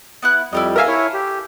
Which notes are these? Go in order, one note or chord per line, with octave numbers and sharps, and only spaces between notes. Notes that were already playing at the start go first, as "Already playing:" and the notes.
B3 E4 F#6
F2 G3 E4 G4 D#5
A4 A#4 E5 F5 G#5
E4 C#5
G4